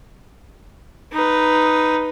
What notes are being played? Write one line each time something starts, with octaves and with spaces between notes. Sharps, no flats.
D#4 B4